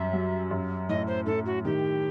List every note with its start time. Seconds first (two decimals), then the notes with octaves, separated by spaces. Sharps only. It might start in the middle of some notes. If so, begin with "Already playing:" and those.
Already playing: F#2 G3 E5
0.13 F#3
0.51 F#2
0.89 A2 D#5
1.07 C5
1.26 A2 A4
1.46 F#4
1.65 D#3 G4